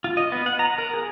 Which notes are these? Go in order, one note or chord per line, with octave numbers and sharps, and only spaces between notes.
F4
D#5
B3
F#5
A#5
A#4
G#4